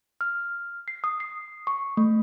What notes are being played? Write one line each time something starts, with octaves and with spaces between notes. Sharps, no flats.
F6
C7
D#6
C7
C#6
A3